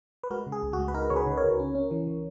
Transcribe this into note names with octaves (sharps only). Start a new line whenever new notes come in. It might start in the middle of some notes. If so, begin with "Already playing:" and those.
B4
G#3 F#4 A#4
C#3
G#4
C#2
F#4
G#3
B4
D#4 F#4 A#4
C#3 C#5
G#4 B4
C#3
B4
A#4 C#5
C#2
C#4
C#4
E3
E3